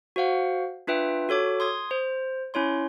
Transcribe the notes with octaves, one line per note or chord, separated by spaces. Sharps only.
F#4 C5 F5 F#5
D4 F4 B4 E5 G5
F#4 A4 C#5 D6
C6 D#6 G#6
C5
C#4 E4 C#5 C6